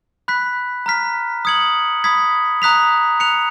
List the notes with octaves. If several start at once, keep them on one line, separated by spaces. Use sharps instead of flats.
B5 F#6 B6
A#5 F6 B6
D#6 G#6 C#7 F#7
B5 D#6 G#6 B6
A#5 D#6 F#6 B6 F7
F#6 C#7 F7